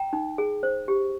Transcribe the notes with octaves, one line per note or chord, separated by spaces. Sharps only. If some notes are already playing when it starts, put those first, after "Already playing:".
Already playing: G5 A#5
D#4
G#4
C5
G4